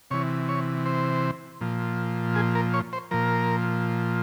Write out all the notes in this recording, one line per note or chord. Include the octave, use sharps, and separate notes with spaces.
C3 E3 C#5
C#5
C5
A#2 F3
G#4
A#4
C#5
C5
A#2 F3 A#4